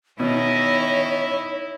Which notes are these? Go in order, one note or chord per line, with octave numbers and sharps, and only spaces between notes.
B2 D#3 C#4 D#4 E4 C#5